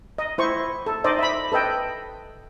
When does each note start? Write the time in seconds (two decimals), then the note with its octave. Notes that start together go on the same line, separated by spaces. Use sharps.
0.18 D#5
0.38 E4 C5 C#6
0.86 A4
1.04 D#4 C5 D5 D#5
1.19 E5 B5
1.52 A4 B4 D#5 G5